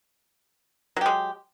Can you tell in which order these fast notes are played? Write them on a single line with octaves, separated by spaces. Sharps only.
F#3 G4 G#3